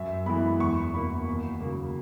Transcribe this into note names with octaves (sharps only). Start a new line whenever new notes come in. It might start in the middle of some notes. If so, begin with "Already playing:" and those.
Already playing: F#2 E5
E3 G#3 B3 B5
E2 C#6
B2 A#3 B5
D#2
C#3 F#3 A#3